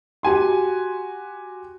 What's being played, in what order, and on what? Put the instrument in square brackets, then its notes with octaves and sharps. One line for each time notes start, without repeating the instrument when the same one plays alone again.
[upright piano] F#4 G4 G#5 C6